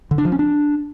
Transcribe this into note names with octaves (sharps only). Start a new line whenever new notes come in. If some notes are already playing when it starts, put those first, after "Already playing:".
D3
D4
F3
C#4
D4